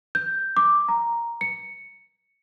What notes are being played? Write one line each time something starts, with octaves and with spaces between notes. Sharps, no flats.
G6
D6
A#5
C#7